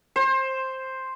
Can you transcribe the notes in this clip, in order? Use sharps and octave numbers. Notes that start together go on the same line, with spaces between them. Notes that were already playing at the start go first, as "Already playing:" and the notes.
C5